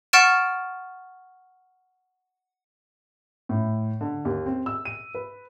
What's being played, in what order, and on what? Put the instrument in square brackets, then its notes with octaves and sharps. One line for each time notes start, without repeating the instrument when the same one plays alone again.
[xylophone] F#5 C#6 F6 A6 D7 E7
[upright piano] A2
D3
D#2
C4
E6
D#7
B4